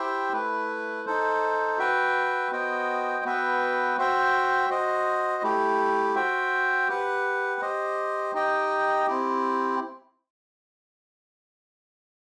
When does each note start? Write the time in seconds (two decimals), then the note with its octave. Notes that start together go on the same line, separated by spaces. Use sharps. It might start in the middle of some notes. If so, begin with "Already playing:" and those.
Already playing: E4 G4 C5 E5 G5
0.33 A3 E4 B4
1.06 D#4 A4 C5
1.78 F#4 B4 E5 G5
2.52 B3 F#4 C5 D#5 G5
3.24 B3 F#4 B4 E5 G5
3.98 F#4 C5 E5 G5
4.70 F#4 C5 D#5
5.43 A3 E4 G4
6.15 F#4 C5 E5 G5
6.88 G4 B4 F#5
7.61 G4 C5 D#5
8.33 D#4 G4 D#5 G5
9.06 C4 E4 G4